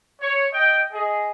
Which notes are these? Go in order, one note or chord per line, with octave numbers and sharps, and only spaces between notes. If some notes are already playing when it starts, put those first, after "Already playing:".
C#5
D#5 G5
G#4 D#5